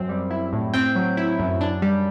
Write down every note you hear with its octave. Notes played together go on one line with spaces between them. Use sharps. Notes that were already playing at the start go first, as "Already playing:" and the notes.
Already playing: F#2 C4
G3
E4
A2
C4 G5
F#3
E4
F#2
D4
G3